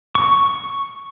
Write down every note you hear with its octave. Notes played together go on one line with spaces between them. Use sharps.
C#6